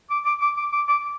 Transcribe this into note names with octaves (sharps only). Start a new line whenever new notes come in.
D6
D6
D6
D6
D6
D6